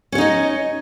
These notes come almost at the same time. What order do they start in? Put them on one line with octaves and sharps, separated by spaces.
C#4 C#5 D#4 D#5